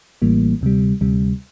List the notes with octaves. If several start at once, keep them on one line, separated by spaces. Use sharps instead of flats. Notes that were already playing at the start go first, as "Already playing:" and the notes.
A1 A2 E3 G3 A#3
D2 C3 G3
D2 C3 G3